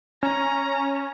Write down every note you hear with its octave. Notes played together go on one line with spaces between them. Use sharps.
C#4 A#5